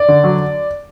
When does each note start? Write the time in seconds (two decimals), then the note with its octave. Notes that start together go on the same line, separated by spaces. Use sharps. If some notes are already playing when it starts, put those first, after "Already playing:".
Already playing: D5
0.08 D3
0.24 F#3